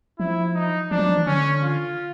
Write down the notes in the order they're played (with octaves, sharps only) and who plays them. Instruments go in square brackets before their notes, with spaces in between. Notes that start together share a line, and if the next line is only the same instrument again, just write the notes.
[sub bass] F3 [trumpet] E4
[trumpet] D#4
[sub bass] F3 [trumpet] D4
[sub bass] F#3
F3
E3
[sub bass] D3 [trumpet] C#4
[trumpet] F4